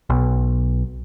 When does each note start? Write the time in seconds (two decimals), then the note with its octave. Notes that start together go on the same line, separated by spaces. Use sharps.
0.10 B1